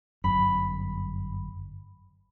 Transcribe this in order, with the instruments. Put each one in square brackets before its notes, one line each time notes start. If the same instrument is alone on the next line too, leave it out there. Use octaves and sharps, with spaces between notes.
[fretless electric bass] G1 F#2 [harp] B5